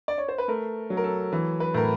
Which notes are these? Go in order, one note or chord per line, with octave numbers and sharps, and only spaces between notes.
D5
C#5
C5
B4
A3 A#4
F#3
A#4
A4
E3
B4
A2 A#4